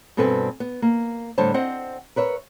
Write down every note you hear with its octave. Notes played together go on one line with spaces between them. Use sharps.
G2 B2 C4 A4 B4 G#5
B3
A#3
A2 D3 G3 C5 C#5 A5
C4 C5 D#5 F#5
A#4 B4 C#5 E5